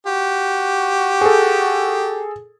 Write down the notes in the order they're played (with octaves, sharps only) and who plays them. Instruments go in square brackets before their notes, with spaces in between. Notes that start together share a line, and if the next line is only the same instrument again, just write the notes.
[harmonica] F#4 G4
[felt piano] G#4 A4